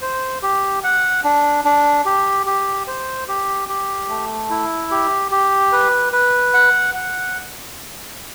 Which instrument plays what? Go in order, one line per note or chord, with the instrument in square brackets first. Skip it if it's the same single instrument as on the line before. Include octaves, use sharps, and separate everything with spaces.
[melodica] C5
G4
F#5
D4
D4
G4
G4
C5
G4
G4
A3
E4
G4
G4
B4
B4
F#5
F#5